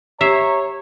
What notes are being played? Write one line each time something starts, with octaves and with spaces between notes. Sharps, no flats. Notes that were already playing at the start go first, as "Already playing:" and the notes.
G4 C#5 E5 A#5 C7